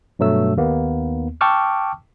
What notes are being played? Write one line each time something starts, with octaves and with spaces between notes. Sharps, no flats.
G2 B2 F#3 A3 E6
D#2 A#3 B3
G5 A5 C#6 D6 E6 F6